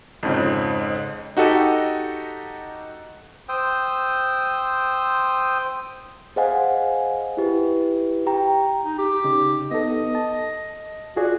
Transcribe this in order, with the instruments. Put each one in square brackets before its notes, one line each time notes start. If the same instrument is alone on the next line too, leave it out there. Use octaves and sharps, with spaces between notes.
[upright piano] F2 G#2 C#3
[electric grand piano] D#4 F#4 G4 A4 D#5
[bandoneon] C5 G5 D#6 E6
[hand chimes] G#4 C5 D#5 F5 F#5 G#5
E4 G4 B4
G4 G5 A#5
[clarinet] D#4
G4
[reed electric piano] C#3 D#4
[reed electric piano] B3 D#4 A4 [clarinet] D#5
[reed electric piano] A5
[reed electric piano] F4 G#4 D5 [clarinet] F#4